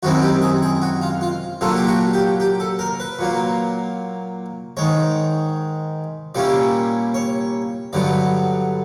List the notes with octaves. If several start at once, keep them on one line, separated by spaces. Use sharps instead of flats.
F#2 D#3 G#3 C4 E4 F#4
G4
G#4
G#4
F#4
F4
F4
A#2 F#3 A#3 D4 F4 A4
G4
F#4
G4
G4
A4
A#4
B4
A#2 F#3 A#3
G#2 D#3 G#3 C#5
A#2 G3 A#3 C#4 E4 D5
C#5
G2 D3 F#3 B3 D5